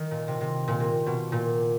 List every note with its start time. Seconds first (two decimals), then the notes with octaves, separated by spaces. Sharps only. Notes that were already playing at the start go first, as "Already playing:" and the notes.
Already playing: D#3
0.11 A#2
0.28 C3
0.41 C3
0.68 A#2
0.80 C3
1.06 B2
1.32 A#2